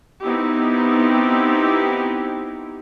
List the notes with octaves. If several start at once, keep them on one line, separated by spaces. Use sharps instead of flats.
B3 C4 D#4 E4 G4